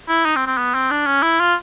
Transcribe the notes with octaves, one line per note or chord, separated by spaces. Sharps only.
E4
D#4
C4
C4
B3
C4
D4
C#4
E4
F4